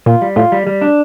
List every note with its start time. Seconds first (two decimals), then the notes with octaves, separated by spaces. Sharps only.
0.06 A#2 F4
0.22 G3
0.36 A2 F4
0.52 G3
0.67 G3
0.82 D4